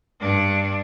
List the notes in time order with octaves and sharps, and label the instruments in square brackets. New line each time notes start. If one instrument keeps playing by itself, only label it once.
[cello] G2 D4